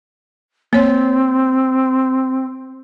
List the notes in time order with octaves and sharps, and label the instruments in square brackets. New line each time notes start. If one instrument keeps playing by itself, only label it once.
[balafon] A#3 C#5 [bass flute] C4